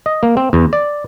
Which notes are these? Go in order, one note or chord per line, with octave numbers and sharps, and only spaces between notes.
D#5
A#3
C4
E2
D5